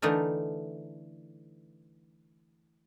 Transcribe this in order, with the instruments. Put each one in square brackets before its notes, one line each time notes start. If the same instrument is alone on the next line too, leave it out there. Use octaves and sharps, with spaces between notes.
[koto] D3 E3 A3 D#4 A#4